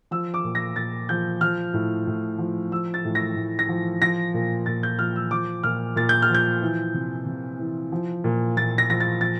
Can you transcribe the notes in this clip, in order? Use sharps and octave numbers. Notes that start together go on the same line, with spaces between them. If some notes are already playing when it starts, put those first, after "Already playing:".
F3 E6
D6
A#2
A#6
A#2 A6
F3 G6
F3 F6
A2
A2
F3
F3 E6
A6
A2
A#6
A2
A#6
F3
F3 A#6
A#2
A#2 A6
G6
F3 F6
E6
F3 D6
A#2 F6
A#2 A6
G6
F6
F3
G6
E3
C3
C3
E3
F3
A#2
A#2 A6
A#6
F3 A#6
A6
F3 A6